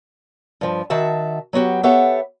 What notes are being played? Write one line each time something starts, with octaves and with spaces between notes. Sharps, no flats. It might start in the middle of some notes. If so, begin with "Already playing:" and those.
G2 F3
D#3 F#4 E5 A5
F#3 B3 F#4 G4
B3 G4 A4 C#5 E5 F#5